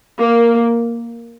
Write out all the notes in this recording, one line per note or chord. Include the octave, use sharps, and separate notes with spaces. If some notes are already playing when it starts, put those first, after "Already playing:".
A#3